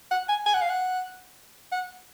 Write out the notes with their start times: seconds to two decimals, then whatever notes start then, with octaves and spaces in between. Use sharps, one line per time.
0.12 F#5
0.29 G#5
0.46 G#5
0.55 F#5
0.62 F5
0.70 F#5
1.72 F#5